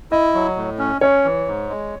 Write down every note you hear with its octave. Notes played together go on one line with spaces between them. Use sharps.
E4 D#5
F#3
A2
C#4
C#4 C#5
E3
G#2
G#3